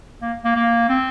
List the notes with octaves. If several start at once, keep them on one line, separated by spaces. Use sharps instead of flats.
A#3
A#3
A#3
C4